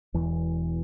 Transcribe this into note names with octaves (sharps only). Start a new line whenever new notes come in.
E1 E2 E3